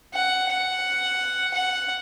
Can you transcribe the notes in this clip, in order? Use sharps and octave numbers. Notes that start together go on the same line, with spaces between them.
F#5
F#5
F#5